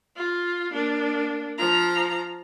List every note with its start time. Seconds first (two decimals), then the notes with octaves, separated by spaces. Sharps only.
0.16 F4
0.71 A#3 D4
1.58 F3 A#5